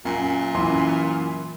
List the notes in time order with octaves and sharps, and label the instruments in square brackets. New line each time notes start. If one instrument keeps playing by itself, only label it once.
[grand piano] F#2 [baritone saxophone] A#2
[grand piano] F#2 E3 C6